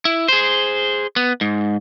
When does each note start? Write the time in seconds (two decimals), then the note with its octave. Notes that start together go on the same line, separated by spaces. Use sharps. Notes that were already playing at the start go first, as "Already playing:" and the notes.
0.05 E4
0.28 G#4 C5
1.16 B3
1.41 G#2